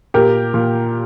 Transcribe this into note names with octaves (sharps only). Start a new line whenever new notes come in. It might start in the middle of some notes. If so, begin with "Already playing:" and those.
A#2 G4 A#4
A#2